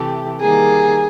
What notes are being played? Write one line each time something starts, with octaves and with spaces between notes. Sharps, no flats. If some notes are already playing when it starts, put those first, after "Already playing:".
Already playing: C3 E3 A3 G4
D#3 G3 A#3 G#4